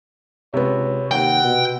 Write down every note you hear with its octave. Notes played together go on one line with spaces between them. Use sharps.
C#2 C3 B3 C#5
D#2 F#5 G5
B2